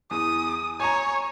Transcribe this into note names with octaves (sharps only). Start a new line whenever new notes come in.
E2 D#6
C#5 G#5 A#5